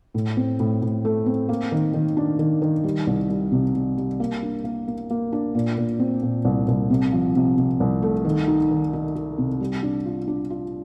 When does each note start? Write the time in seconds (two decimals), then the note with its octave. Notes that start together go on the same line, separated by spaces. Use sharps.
0.14 A2
0.37 C4
0.60 A2
0.82 A2
1.05 A3
1.26 C4
1.49 A#3
1.72 D#3
1.94 D#3
2.17 D4
2.39 D#3
2.62 D#3
2.84 G3
3.07 C2
3.29 G3
3.52 C3
3.75 G3
3.97 G3
4.20 A#3
4.43 D4
4.64 A#3
4.88 A#3
5.10 A#3
5.32 D4
5.55 A#2
5.78 A#2
6.00 C4
6.23 A#2
6.45 C2
6.68 C2
6.90 C3
7.12 F3
7.35 C3
7.58 C3
7.80 C2
8.02 A3
8.25 D#3
8.48 D#4
8.71 D#3
8.93 D#4
9.15 D#4
9.38 C3
9.60 G3
9.83 D4
10.05 F4
10.28 D4
10.50 F4